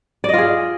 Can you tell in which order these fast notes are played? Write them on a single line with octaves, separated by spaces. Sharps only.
D5 D#5 F4 G#4